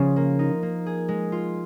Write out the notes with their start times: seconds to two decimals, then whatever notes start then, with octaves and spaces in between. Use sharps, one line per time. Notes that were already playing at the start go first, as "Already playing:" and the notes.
Already playing: C#3 F3
0.16 A#3
0.39 D#4
0.63 A#3
0.86 G#4
1.08 G#3
1.32 F4